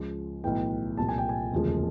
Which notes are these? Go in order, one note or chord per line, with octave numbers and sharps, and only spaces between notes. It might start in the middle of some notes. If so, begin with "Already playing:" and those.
Already playing: C#2 C#3 F3
B1 A2 E3 G5
C2 A#2 F3 A5
G#5
G5
G#5
E1 D2 C#3 F3